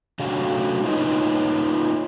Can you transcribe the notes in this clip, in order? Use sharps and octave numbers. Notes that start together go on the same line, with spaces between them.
C3 F#3 A3 D4 F#4 F5
A#3 D#4 F4 B4 C#5 D#5